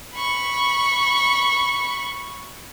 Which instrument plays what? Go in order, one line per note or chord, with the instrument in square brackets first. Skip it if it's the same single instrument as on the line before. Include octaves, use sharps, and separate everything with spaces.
[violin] B5 C#6